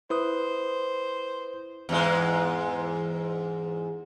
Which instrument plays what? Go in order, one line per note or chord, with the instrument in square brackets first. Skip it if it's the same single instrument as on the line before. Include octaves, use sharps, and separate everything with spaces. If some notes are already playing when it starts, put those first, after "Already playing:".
[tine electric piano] E4 B4 D#6 [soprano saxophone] C5
[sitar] E2 G#2 G#3